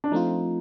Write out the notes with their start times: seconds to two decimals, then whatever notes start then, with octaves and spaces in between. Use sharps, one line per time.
0.04 D4
0.11 F3 A3 C4 D#4 F4